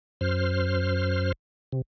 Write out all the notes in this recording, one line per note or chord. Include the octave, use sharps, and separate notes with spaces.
F#2 C5 F6
C3